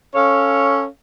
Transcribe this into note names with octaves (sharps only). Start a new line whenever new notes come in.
C#4 A4 C#5 F5